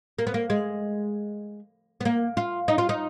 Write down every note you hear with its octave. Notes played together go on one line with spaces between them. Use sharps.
A#3
B3
A#3
G#3
B3
A#3
F4
D#4
F4
D#4